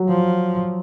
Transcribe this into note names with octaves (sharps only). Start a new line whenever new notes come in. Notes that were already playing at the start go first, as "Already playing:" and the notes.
Already playing: F#3
F3